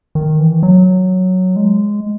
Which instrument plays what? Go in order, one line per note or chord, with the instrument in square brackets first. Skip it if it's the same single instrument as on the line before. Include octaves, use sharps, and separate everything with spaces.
[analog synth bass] D#3
E3
F#3
G#3